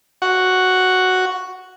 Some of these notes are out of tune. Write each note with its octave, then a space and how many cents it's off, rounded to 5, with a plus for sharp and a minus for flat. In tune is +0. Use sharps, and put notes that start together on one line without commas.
F#4 +0 F#5 +0